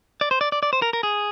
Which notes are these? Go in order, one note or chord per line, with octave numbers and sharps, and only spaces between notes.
D5
C5
D5
D5
D5
C5
A#4
A#4
G#4